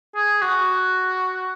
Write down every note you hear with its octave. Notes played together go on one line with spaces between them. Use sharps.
G#4
F#4